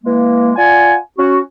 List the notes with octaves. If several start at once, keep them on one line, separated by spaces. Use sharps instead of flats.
E3 G#3 A#3
F4 D5 F#5 G#5
C#4 F#4